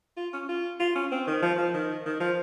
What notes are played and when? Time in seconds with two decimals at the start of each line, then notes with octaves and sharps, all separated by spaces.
0.17 F4
0.33 C#4
0.49 F4
0.80 F4
0.95 C#4
1.11 C4
1.27 D#3
1.42 F3
1.58 F3
1.74 D#3
2.06 D#3
2.20 F3